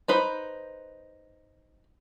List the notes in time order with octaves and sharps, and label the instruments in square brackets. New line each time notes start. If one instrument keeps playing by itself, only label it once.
[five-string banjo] D#4 B4 C5